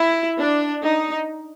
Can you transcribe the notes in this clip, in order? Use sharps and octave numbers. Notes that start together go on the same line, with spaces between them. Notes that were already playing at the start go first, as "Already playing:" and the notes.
Already playing: E4
D4
D#4